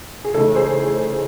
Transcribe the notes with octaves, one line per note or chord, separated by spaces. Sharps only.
G#4
C#3 E3 A3 D#4 A4
G#4 C5